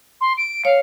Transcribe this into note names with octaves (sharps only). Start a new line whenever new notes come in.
C6
D7
C#5 F5